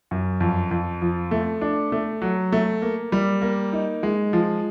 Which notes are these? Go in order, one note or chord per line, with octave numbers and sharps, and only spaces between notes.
F#2
F2
F2
F3
A3
D4
A3
F#3
A3
A#3
G3
A#3
D#4
G#3
F3